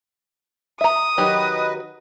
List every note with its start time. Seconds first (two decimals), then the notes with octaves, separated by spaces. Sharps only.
0.81 E5 A#5 D#6
1.18 D#3 F#3 G4 B4 D#5